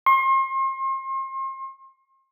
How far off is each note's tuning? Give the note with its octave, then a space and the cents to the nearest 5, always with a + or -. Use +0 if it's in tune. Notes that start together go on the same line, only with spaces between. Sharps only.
C6 +40